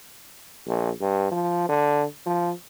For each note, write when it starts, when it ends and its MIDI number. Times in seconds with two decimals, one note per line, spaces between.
0.67 0.90 34
1.01 1.28 43
1.32 1.66 53
1.69 2.05 50
2.26 2.52 53